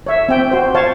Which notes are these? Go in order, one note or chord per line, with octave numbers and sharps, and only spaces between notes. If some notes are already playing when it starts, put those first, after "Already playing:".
C#5 E5
C4 G5
F#4 C5
C5 C#5 F5 A5